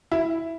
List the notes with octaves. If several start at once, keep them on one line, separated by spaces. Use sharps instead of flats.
E4